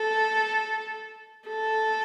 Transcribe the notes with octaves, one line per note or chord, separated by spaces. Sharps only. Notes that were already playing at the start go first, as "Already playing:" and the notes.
Already playing: A4
A4